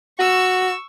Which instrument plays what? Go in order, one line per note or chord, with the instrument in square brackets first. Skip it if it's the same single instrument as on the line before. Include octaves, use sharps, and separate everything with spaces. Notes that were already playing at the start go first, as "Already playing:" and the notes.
[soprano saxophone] F#4 [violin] C#6 E6